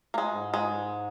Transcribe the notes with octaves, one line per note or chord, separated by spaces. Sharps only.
A#3
G#3
G#2
G#3